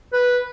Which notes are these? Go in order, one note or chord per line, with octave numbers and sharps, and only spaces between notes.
B4